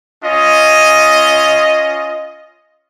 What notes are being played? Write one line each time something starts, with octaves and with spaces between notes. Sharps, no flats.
C#4 F4 D#5